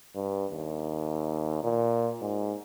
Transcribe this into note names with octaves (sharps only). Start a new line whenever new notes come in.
G2
D#2
A#2
G#2